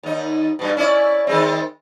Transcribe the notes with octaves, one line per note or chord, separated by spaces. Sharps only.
D#2 D#4
G2 B2
C#4 E4 D5
D#3 G#3 C4